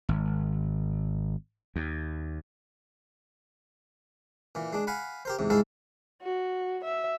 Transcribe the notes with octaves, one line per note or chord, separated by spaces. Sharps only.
G#1
D#2
A#2 E3
G#3 D4
F5 F#5 G#5 B5
G4 A#4 C5
E2 G#2 C3
C2 G#2 G#3 E4 A4 F5
F#4
E5